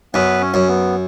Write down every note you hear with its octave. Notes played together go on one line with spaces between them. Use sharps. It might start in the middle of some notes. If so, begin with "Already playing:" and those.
F#2 B3 B4
C#4
F#2
B3